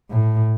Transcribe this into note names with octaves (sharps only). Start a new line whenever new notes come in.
A2